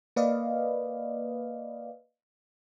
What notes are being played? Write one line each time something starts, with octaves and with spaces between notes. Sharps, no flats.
A#3 B4 D5 D#5 F5